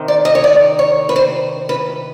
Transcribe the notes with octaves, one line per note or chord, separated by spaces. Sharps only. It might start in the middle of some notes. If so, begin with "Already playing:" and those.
Already playing: C3 D#3
D5
D#5
C#5
D5
C#5
B4
C5
B4